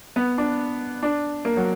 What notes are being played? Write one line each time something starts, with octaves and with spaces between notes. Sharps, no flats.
B3
D4
D4
A#3
F#3